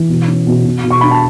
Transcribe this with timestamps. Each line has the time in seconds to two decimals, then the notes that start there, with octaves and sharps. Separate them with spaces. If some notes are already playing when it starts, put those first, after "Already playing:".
Already playing: E3
0.09 B2
0.28 C#4
0.47 B2
0.65 B2
0.84 B2
0.91 C#6
1.01 D4 B5
1.11 A5